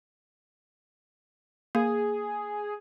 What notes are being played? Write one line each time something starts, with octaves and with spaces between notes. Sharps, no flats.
A#3 G#4